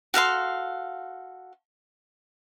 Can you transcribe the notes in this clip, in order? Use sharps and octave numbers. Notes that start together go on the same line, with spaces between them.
F#4 A4 F5 C6